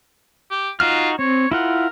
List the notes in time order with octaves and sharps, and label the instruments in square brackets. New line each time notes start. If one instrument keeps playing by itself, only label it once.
[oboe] G4
[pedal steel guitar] D#4 F#4 F6 [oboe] F4
[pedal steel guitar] C4 [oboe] C#5
[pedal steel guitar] E4 F4 F#5 [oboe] A#4